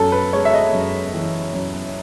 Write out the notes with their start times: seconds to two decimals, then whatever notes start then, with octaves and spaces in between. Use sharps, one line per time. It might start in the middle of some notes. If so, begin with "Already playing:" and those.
Already playing: F#2 A4
0.12 B4
0.33 G#3 C#5
0.45 E5
0.54 D#5
0.73 F#2
1.14 E3
1.54 F#2